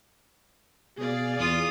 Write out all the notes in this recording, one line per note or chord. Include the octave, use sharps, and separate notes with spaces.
B2 G#4 D5 F5
E2 F4 D#6